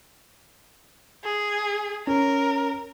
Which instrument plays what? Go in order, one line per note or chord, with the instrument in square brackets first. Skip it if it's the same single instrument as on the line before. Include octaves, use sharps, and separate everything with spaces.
[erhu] G#4
[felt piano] C#4 [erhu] A#4